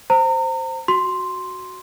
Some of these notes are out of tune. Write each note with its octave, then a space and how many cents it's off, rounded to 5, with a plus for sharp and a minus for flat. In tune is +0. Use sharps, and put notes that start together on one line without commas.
C5 +0 A#5 -35
F#4 +0 C6 +0